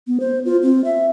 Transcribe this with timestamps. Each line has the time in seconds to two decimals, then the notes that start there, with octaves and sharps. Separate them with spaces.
0.07 B3
0.20 C5
0.45 F4
0.63 C4
0.84 E5